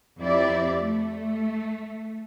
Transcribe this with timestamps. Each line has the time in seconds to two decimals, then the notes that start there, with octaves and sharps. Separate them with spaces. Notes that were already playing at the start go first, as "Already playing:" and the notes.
0.20 F2 C4 E4 G4 D5
0.79 A3